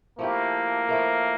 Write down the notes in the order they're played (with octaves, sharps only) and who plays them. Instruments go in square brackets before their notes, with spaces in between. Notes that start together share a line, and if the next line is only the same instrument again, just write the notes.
[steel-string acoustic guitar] F3 A3 E4 G4 [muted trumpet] A#3
[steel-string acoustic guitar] A2 F3 A3 E4 A#4